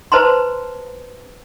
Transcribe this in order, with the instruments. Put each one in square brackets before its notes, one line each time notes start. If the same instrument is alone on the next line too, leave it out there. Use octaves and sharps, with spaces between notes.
[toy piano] B4 C5 A5 A#5 C6